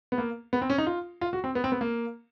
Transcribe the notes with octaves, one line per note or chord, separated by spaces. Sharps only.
B3
A#3
B3
C4
C#4
D#4
F4
F4
F#4
C4
B3
C4
B3
A#3